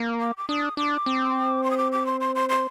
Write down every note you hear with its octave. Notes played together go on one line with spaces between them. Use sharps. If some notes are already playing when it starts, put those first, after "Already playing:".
Already playing: A#3
D6
D6
D4 D#6
D4 D6
C4
C6
D#6
D6
D6
C6
C6
C6
C6